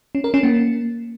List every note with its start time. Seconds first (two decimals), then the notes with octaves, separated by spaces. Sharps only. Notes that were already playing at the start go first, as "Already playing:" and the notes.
0.15 C#4
0.24 A#4
0.34 C#4
0.43 A#3